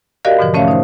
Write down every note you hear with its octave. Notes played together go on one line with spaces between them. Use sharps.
F#4 G4 A#4 D5 D#5 F5
G#2 B2 D3 E3 F3
A3 C#4 C#5 E5 F5
D#4 C5